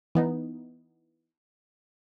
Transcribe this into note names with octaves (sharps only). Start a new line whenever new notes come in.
E3 B3 D#4